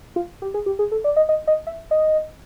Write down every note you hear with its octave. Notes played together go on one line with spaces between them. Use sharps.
F4
G4
G#4
G4
G#4
A4
D5
D#5
D#5
D#5
E5
D#5